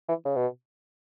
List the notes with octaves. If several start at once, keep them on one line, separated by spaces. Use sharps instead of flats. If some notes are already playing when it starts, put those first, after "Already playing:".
E3
C#3
B2